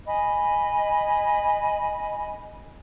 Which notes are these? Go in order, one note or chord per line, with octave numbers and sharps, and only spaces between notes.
D#5 G#5 B5